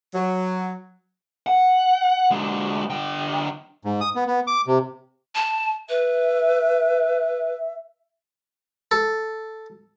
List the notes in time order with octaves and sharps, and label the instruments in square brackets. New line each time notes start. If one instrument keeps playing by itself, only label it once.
[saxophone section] F#3
[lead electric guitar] F#5
D3 G#3
D3 G5
[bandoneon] G#2
D#6
B3
B3
D6
C3
[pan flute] A5
[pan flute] B4 [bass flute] E5
[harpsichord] A4